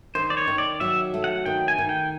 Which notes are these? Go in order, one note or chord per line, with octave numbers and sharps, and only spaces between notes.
D#3 C5
D5
C#5
D#3
D5
F#3 E5
A3
F#5
D#3 G5
G#5
D#3
G5